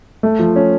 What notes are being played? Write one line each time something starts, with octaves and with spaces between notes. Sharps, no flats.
A3
F3
C#4